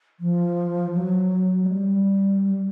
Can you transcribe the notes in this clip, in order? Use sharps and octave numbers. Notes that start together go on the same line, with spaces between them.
F3
F#3
G#3
G3
G3